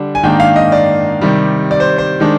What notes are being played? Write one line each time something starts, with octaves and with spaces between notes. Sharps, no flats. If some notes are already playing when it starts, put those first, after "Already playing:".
Already playing: D3 G3 D4
G#5
G#2 D#3 A#3 D4 G5
F5
D#5
D5
C3 D#3 G3
D5
C5
C5
D#3 G#3 D4